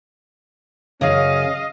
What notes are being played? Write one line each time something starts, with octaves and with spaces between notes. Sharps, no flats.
F#2 C#3 C#4 D#5 F5